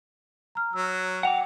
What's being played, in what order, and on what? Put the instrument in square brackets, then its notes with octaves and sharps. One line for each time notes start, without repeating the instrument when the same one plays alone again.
[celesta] A#5 F6
[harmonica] F#3 [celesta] E6
[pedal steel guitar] F#5 D6 [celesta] G5 F7